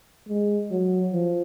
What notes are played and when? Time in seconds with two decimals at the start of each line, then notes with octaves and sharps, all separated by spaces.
0.29 G#3
0.71 F#3
1.13 F3